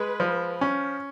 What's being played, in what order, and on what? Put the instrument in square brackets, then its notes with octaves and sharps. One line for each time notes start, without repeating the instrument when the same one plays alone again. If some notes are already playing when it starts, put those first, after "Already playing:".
Already playing: [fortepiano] G#3 [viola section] B4
[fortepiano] F3
C#4